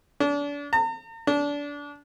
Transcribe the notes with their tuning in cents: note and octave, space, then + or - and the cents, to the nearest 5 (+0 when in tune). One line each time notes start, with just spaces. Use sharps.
D4 -35
A#5 -45
D4 -25